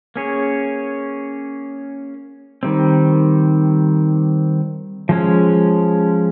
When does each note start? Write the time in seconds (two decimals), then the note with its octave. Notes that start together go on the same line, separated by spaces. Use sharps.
0.16 A#3 C#4 G#4 C#5
2.63 D#3 G3 C4
5.09 F3 G#3 C#4